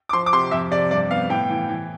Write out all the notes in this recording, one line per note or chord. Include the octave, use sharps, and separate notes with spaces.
D6
F3 C6
D6
C3 C6
F2 E5
C3 D5
G2 D5
B3 F5
A2 G5
E3
E3